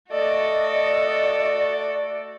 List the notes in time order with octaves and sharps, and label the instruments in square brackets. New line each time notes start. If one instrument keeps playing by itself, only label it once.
[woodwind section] A3 D5 [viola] F#4 A4 [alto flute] D#5